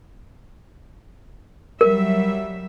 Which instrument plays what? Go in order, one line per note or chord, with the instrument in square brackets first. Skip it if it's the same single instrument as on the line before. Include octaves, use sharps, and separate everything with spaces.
[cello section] F#3 G3 E5 [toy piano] A#4